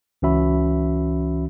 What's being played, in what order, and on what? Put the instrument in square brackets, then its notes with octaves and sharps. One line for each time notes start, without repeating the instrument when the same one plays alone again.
[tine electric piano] C#2 E3 C#4 F#4 E5 B5